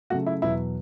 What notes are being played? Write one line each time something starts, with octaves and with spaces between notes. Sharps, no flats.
C#3 F#3 A3 F#4
E4
E2 B2 F#3 E4